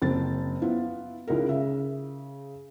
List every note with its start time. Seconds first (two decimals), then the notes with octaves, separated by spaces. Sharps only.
0.02 F#1 C4 A6
0.62 B3 E4 F4
1.27 C#2 C#3 D#4 E4 A#4
1.48 C#3 E5